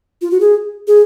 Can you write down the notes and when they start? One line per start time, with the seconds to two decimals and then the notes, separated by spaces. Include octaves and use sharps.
0.22 F4
0.31 F#4
0.41 G#4
0.88 G#4